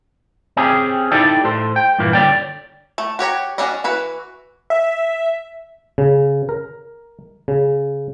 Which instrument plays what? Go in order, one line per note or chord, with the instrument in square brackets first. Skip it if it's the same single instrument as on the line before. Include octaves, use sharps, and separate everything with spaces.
[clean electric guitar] C4 C#4 G4 G#4
D#4 E4 G4 A4 D5 G5
A2 A4 C5
G5
G2 A#2 E3 A#3
D3 C#5 D5 G5
[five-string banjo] A3
F#4 G4 C#5 A#5
C#4 D4 F#4 D5 D#5
E3 F#4 B4
[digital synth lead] E5
[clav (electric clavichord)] C#3
A#4
C#3